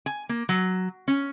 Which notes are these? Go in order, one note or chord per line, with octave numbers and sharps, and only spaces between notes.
G#5
A#3
F#3
C#4